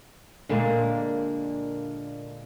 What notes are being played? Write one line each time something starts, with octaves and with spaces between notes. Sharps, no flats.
A#2 D3 G#3 A#3